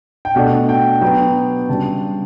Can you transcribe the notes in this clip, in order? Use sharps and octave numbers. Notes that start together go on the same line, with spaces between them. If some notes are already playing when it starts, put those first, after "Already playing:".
G5
B2 A3 D4 F#5
G5
F#3 B3 D4 G5
C#3 G3 D4 A5